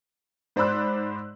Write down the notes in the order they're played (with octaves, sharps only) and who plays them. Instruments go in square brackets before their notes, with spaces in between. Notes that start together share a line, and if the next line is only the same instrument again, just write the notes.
[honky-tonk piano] G#2 C5 D5 B5 E6 F#6